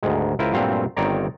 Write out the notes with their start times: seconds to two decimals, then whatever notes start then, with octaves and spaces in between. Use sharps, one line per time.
0.03 D2 G#2 D#3 G#3
0.39 C#2 E4 F4 A#4 C5
0.53 G2 A#2 F#3 A3 C4 F5
0.97 G1 D#3 C4 C#5 D5 A#5